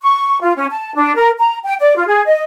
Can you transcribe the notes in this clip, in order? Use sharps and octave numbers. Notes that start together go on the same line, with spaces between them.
C#6
F4
C#4
A5
D4
A#4
A#5
G5
D5
F4
G#4
D#5